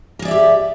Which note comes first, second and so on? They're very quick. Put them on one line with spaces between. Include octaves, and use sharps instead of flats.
A#4 G#4 D5 E5 G4